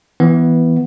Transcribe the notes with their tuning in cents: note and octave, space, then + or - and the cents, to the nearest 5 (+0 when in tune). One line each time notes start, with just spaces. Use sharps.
E3 +0 B3 -5